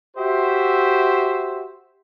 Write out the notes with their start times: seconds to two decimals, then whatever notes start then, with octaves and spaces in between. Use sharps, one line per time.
0.17 F#4 G4 C5 E5